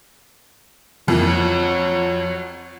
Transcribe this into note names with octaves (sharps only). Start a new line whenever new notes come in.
F2 E3 A#3
C#5 F#5